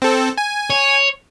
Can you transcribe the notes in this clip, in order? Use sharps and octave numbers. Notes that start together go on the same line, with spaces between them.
C4 A4
G#5
C#5